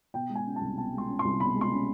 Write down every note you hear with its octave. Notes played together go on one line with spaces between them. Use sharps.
B2 G5
G#3
G#5
C#4
C2 A5
B2 A5
G#3 C6
C#4
C6
C2
B2 B5
G#3
C6
C#4